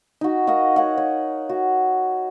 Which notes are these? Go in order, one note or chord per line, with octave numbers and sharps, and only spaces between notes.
D#4 F#4
F#4 A#4 D#5 F5
C#5 F5 F#5
C#5
F#4